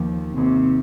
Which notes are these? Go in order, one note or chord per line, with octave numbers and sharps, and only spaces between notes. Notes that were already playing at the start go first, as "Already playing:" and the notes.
Already playing: D#2 D#3 F3 A#3
D#2 C3 D#3 A#3